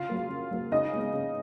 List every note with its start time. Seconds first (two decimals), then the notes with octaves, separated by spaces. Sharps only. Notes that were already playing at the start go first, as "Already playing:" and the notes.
Already playing: C#3 F4 F5
0.09 F#3 A#3
0.30 C#3
0.51 F#3 A#3
0.72 C#3 D#4 D#5
0.93 G#3 B3
1.14 C#3